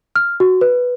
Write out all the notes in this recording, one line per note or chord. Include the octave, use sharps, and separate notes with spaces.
F6
F#4
B4